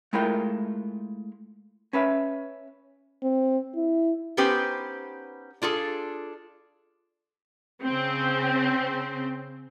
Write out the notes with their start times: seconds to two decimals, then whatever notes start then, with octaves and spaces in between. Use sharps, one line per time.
0.13 G#3 A3 E4 F4 A#4 G5
1.93 C#4 B4 E5
3.23 C4
3.75 E4
4.37 B3 C#4 D#4 G4 B4 C5
5.62 D4 F4 G#4 A4
7.83 C#3 C4